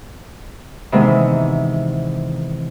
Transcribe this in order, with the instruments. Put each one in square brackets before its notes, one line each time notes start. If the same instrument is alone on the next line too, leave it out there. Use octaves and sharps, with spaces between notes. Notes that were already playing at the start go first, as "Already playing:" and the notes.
[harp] C3 D#3 E3 G#3 B3 D#4